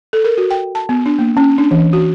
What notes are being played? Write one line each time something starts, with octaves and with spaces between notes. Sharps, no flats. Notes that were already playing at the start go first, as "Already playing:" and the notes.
A4
A#4
F#4
G5
A5
B3
D4
A#3
C#4
D4
E3
F#4